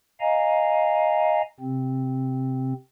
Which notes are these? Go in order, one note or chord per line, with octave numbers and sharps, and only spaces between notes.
D#5 F5 G#5 A#5
C3 C4